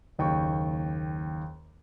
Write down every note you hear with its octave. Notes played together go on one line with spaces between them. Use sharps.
F#1 D#2 G5 C#6